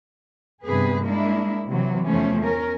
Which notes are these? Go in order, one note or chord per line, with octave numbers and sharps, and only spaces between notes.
G2 C3 B3 G#4 B4
G#3 A#3 D4 E4
C3 E3 F#3
E2 E3 F3 A3 C#4
C#4 A#4